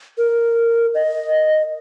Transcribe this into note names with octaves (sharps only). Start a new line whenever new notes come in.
A#4
D#5